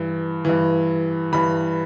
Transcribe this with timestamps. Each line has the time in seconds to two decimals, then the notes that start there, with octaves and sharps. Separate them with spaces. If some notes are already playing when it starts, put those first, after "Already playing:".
Already playing: G2 E3
0.45 G2 E3
1.33 G2 E3 B5